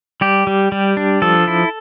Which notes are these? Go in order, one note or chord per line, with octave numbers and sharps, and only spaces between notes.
G3 G4
G3
G3
D4
F3 A4
E4